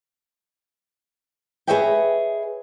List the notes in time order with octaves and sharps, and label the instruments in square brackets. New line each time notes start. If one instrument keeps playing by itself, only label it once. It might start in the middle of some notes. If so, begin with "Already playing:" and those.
[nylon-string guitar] G#4 B4 C#5 D#5 E5 G5